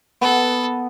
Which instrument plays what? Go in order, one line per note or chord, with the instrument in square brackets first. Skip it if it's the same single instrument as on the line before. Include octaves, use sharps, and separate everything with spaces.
[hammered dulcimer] B3 [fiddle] A4